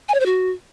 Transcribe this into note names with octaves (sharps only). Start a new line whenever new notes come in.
G#5
C#5
C5
F#4